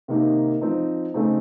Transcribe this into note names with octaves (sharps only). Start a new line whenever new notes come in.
C3 D#3 A#3 D#4
F3 C4 D#4
C#3 A3 C4 D#4